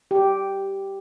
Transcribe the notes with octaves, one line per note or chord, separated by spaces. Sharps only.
G4